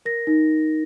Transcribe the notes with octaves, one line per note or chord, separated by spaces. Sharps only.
A#4 A#6
D#4